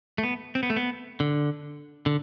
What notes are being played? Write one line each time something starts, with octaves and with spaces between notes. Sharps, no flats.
A3
B3
C4
B3
A3
B3
D3
D3